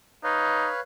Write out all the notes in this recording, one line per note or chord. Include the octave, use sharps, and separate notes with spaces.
D#4 B4 C#5 F5